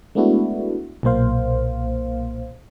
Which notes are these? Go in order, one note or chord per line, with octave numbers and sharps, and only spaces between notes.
G#3 A3 B3 D4 E4 F#4
B1 A#2 A#3 C5 F5